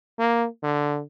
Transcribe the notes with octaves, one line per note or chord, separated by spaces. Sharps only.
A#3
D3